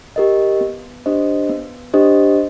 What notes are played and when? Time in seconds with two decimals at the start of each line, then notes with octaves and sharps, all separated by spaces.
0.16 G4 A#4 D#5
0.61 B3
1.06 D4 G4 C5 D#5
1.50 B3
1.93 D4 G4 C5 D#5